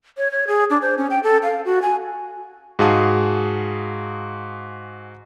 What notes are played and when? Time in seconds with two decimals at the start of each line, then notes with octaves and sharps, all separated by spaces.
0.17 C#5
0.32 C#5
0.47 G#4
0.70 D4
0.82 C5
0.98 C#4
1.10 G5
1.23 A4
1.43 F5
1.65 F#4
1.82 G#5
2.79 G#2 F#4 G#4 F5 A5 D#6